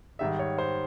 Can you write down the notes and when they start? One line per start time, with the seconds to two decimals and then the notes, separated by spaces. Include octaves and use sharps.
0.19 G#2 D#3 G3 E5
0.39 C#5
0.58 C5